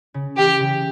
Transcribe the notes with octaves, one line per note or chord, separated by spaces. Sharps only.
C#3
E3 G4
C#3